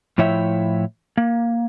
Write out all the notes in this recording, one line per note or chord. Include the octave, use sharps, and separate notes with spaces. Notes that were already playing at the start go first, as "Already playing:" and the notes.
A2 F3 E4 C#5 E5 G5
A#3